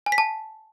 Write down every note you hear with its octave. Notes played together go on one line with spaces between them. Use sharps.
G#5
B6
A5